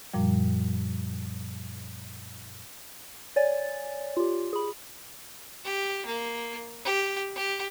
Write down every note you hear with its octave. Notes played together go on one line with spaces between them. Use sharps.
F#2 A#2 F3 G3
C#5 D5 G#5 A6
F4 G4
G#4 B5
G4
A#3
G4
G4